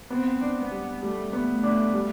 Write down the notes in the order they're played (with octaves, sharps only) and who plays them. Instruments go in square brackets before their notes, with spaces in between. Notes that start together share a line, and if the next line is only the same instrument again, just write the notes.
[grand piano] B3 [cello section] C4
[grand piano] D4
[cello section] B3
[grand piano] G3
[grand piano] G3 [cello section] A3
[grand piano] B3
[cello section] A3
[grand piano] D4
G3